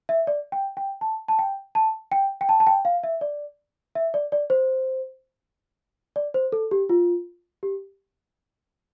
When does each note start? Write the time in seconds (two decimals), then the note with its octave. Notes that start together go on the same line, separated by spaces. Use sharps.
0.09 E5
0.27 D5
0.52 G5
0.77 G5
1.01 A5
1.28 A5
1.39 G5
1.75 A5
2.12 G5
2.41 G5
2.49 A5
2.60 A5
2.67 G5
2.85 F5
3.04 E5
3.21 D5
3.95 E5
4.14 D5
4.32 D5
4.50 C5
6.16 D5
6.34 C5
6.52 A4
6.71 G4
6.89 F4
7.63 G4